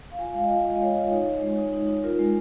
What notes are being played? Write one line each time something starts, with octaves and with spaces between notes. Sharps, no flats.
F5
F4 G#5
G#3 F5
D#5
F4 F5
F4 F5
D#5
G#3 C#5
F4 D#5
D#4 C#5
D#4
G#3
D#4
D#4
D#4
F4 A#4
G#3